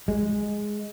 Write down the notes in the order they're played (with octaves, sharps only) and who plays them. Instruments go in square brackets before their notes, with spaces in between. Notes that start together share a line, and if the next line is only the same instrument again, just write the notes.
[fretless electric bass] G#3